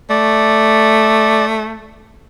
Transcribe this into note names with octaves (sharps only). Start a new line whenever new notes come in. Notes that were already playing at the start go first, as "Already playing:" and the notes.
A3 D5